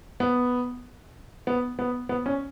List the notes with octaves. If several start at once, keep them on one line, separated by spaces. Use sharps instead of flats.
B3
B3
B3
B3
C#4